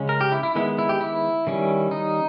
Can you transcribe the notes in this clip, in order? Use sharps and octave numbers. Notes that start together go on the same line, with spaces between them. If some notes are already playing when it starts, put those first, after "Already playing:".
Already playing: C#3 G#3 C#4
A#4
G4
E4
E4
D#3 G#3 B3 E4
E4
G4
E4
D#3 G3 C#4
D#4